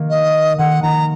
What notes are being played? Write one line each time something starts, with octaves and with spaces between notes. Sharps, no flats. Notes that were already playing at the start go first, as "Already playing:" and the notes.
Already playing: D#3 A#3
D#5
D#3 F#5
D#3 A#5